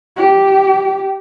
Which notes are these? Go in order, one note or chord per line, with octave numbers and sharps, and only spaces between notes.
G4